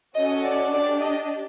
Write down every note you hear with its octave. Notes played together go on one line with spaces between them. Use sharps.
C#4 F#4 A4 D#5
D5
D4 G4 D5
D#5